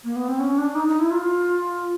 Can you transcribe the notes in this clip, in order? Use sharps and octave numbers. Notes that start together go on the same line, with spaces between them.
A#3
B3
C4
C#4
D4
D#4
D#4
E4
F4